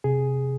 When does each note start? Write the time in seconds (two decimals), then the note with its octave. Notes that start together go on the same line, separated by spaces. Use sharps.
0.04 C3 G#4